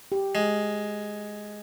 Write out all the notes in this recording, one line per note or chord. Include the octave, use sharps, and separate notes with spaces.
G4
G#3